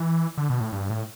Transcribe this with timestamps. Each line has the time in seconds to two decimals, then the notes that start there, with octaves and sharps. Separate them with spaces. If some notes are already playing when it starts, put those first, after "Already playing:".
Already playing: E3
0.38 D3
0.50 B2
0.61 A2
0.72 G2
0.90 A2